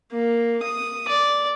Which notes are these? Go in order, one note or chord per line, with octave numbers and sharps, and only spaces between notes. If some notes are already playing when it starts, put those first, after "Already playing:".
A#3
D#6
D5